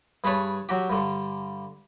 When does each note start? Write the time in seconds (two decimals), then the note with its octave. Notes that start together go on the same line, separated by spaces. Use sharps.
0.24 G2 G#4 B4 C#5 A5
0.69 F#3 F#4 G4
0.90 G2 D3